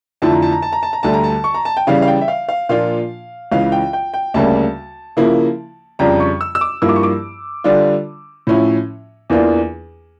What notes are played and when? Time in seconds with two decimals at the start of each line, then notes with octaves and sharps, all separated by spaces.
0.22 F2 D3 F3 A3 E4 A5
0.32 A#5
0.42 A5
0.52 A#5
0.62 A5
0.73 A#5
0.83 A5
0.93 A#5
1.03 D2 D3 G3 D4 A5
1.14 A#5
1.24 A5
1.44 C#6
1.54 A#5
1.65 A5
1.77 G5
1.87 C#3 E3 G3 F5
2.02 F5
2.08 G5
2.21 E5
2.28 F5
2.49 F5
2.69 A#2 F3 A#3 D4 F4 F5
3.52 C#2 C#3 E3 F5
3.72 G5
3.93 G5
4.14 G5
4.34 D2 C#3 G3 A#3 A5
5.17 C#3 F3 A#3 E4
5.99 F2 C#3 G3 D4 A#5
6.20 C#6
6.41 E6
6.55 E6
6.61 D6
6.82 G2 F3 A#3 E4 E6
6.89 D6
6.96 C#6
7.03 D6
7.64 D3 G3 D4 F4
8.47 A2 F3 C#4 E4
9.30 E2 E3 A#3 D4 F4